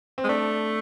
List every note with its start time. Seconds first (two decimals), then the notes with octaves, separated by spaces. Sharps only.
0.18 C4
0.24 G#3
0.29 A3 D4